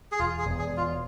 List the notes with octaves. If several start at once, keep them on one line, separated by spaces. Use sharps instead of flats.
G#4
E1 F4
G#4
E1
G#4
B2
F4